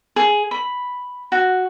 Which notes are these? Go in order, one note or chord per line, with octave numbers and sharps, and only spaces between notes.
G#4
B5
F#4